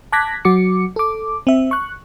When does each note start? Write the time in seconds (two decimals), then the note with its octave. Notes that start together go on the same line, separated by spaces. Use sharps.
0.13 A5 D6 F#6 G#6 A#6 B6
0.45 F#3 F#4 D6 C#7
0.96 A4 D6
1.47 C4 E5
1.71 C#6 F#6